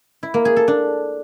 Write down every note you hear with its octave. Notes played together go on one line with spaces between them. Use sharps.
E4
A#3
G#4
A4
D4